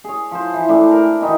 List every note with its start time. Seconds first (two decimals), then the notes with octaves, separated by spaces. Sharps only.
0.04 G#4 C#5
0.31 F3 C5
0.54 E3
0.68 A2 D4 A5
0.91 A#4
1.21 D#3 E3 D#4 F#4